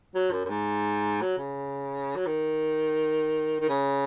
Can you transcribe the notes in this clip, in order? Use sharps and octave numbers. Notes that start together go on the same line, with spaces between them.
F#3
F#2
F#2
G#2
F#3
C#3
F#3
D#3
D#3
C#3